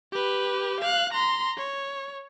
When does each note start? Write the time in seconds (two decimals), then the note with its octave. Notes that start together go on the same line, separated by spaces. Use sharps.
0.12 G4 B4
0.81 F5 F#6
1.13 A#5 C6
1.57 C#5